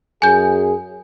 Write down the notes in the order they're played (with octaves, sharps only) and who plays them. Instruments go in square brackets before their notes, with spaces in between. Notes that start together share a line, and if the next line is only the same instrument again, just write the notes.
[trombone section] F#2 G#4 [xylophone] G#5 G6